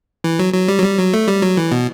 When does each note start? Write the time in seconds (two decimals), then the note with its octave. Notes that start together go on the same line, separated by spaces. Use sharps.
0.24 E3
0.39 F#3
0.54 F#3
0.68 G3
0.79 F#3
0.83 G3
0.98 F#3
1.14 A3
1.28 G3
1.42 F#3
1.57 E3
1.71 B2